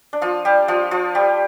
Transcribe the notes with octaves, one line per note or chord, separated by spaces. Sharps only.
D4
F3 F4
G3 G4
F3 F4
F3 F4
G3 G4